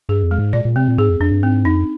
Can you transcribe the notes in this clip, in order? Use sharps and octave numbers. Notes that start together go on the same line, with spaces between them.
G2 G#4
F2
G#3
G#2
A#2 D5
A#2
C3 C4
A#2
G#2 G#4
F2
F2 D4
G2
G#2 C4
F2 D#4